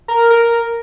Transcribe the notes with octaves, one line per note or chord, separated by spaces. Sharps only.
A#4
A#4